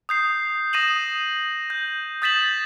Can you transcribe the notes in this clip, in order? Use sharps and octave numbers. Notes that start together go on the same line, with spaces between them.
D#6 G6 C7
D#6 A#6 D#7 E7 F#7
G6
D#6 G6 A6 B6 E7 F#7